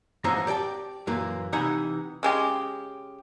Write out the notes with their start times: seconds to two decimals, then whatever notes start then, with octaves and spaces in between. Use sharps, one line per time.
0.24 F2 G#2 E3 F#3 C5 A#5
0.47 G4 D5 G5 A5
1.07 F#2 A#2 E3 A#3
1.52 C3 E3 D#4 F#5 G#5 B5
2.23 C#3 G#3 G4